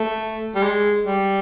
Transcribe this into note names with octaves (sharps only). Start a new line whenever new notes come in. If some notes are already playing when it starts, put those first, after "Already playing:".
Already playing: A3
G3
G#3
G3